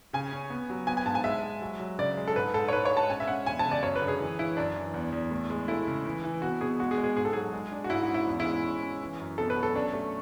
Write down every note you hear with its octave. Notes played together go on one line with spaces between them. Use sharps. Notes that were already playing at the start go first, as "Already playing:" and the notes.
C#3 G#5
C#4
B3
F#3
B3 G#5
G#5
G#2 A5
G#5
G#3 E5
G#3
F#3
F#3
C#3 D5
G#3
A4
G#2 B4
G#2 A4
C#5
G#2 B4
C#5
G#3
A5
C#4 G#5
E5
C#4 F#5
E2 G#5
A5
C#3
D5
F#2 C#5
B4
D3
G#4
E3
E3 E4
F#2 D4
E3
E2
E2
A2
G#3
A3 E4
C#3
E3
E3
B2 F#4
B2 G#4
G#3 F#4
G#4
G#3
G#4
G#2 G#4
A4
F#3 G#4
G#3
D4
F#4
G#2 E4
F#4
C#4
E4
E2
E4
G#3
C#4
C#4
E3
F#2
B2 A4
B4
F#3
A4
C#4 D4
A3